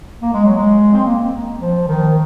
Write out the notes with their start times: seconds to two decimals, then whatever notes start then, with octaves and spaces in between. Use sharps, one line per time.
0.22 A#3
0.33 G#3
0.45 F#3
0.56 G#3
0.93 C4
1.05 A#3
1.60 F3
1.88 D#3